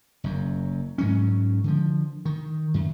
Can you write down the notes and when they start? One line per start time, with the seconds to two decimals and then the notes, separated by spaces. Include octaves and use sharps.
0.24 F#1 F#2
0.98 G#2 F#3 C#4
1.64 D3 F3
2.25 D#3
2.74 F#2 D#3